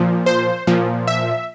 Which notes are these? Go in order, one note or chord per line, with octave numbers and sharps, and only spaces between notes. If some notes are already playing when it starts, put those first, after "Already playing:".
Already playing: A#2 F3
C5
A#2 F3
E5